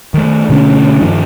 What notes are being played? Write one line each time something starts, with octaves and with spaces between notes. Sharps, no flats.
D#3 A3
B2 D3 A3 C#4
G2 D#3 F3